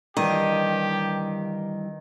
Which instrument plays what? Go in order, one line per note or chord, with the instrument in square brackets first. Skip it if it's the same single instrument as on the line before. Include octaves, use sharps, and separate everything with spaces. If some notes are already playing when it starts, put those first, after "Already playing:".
[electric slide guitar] G2 E3 D4 [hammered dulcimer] D#3 [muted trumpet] G4 [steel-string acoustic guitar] D#5